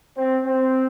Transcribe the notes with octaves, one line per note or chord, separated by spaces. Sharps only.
C4
C4